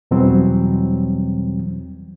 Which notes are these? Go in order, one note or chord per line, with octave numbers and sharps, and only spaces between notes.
E2 B2 E3 F#3 G3 C4